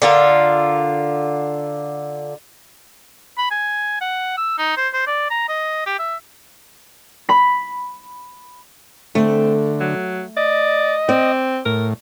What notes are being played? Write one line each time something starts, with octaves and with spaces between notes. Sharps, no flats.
D3 F4 A#4
B5
G#5
F#5
E6
D#4
C5
C5
D5
A#5
D#5
G4
E5
B5 B6
D3 A3 C4
F#3
D5 D#5
C4 D5
A2 A#4